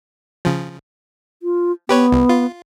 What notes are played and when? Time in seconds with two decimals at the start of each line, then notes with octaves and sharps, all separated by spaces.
0.45 C#3 F3
1.43 F4
1.89 B3 G4 B4 C#5
2.12 C2
2.29 F4